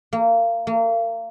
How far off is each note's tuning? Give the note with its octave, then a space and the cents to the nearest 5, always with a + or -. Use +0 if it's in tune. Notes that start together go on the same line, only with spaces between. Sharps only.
A#3 -25
A#3 -35